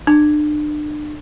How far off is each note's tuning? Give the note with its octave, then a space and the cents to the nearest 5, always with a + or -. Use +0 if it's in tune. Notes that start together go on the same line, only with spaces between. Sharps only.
D4 +35